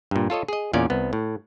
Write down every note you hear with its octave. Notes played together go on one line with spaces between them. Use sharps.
G2 A#2
F4 A4 C#5 D#5
G#4 D#5
E2 A#2 C#4 D5 F5
C2 B3
A2